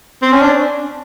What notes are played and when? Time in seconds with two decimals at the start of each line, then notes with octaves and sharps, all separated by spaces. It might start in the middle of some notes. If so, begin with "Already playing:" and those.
0.22 C4
0.32 C#4
0.42 D4